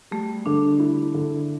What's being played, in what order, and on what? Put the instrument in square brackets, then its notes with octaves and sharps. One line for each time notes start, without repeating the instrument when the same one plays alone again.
[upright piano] G3 [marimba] A3
[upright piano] D3 [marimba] D4
[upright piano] E4
D3